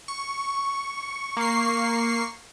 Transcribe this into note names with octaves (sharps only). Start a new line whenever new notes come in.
C#6
A#3 C7